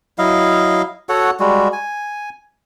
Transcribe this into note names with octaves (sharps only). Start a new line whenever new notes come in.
F#3 E4 D#5 F5
F#4 A4 C#5 F#5
G3 G#3 F#4
G#5